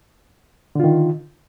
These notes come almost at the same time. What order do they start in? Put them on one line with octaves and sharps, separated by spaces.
D3 F4 D#3